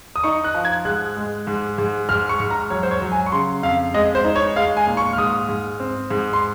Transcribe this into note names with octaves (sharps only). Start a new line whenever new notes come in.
D#6
D#4 C#6
F#6
F3
G#6
G#2 F#6
G#3
G#2
G#2
G#2 F6
C#6
G#2
A#5
F#3 C#5
C5
C#5
F#3
G#5
C#6
C#3 C6
F2 F5
G#3 D#5
C5
D#4
C#5
G#3 F5
G#5
A#2
C#6
F6
G#2 D#6
G#2
C4
G#2
C6